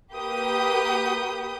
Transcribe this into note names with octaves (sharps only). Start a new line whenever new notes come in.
A#3 G4 A#4 B4 D#6 G6